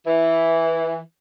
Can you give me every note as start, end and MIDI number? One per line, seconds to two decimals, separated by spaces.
0.07 0.98 52